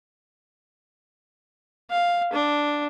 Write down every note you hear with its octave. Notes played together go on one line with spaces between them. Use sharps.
F5
D4